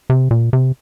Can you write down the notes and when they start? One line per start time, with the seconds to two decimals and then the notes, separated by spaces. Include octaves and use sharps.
0.10 C3
0.31 A#2
0.53 C3